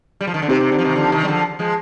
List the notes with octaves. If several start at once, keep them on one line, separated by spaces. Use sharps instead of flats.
G3
F3
D#3
D3
C3 C4 D#4 G4 C5
C3
D3
F3
C3 D#3
D3 F3
C3 D#3
G3
D3 F3
F3 G#3